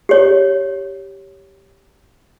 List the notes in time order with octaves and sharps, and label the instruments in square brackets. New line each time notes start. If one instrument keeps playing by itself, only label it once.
[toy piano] G4 C#5